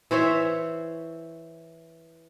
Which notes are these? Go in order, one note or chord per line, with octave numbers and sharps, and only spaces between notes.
E3 C5 C#5 E5